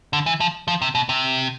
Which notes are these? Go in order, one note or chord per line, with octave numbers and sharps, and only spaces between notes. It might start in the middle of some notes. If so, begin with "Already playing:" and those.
D3
E3
F3
F3
C3
B2
C3